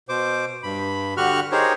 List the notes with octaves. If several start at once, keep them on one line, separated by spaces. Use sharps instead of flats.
B2 C5 D6
G2 B5
D3 F#4 G4 C#6 F6 F#6
D#4 G4 G#4 A#4 C5 C#5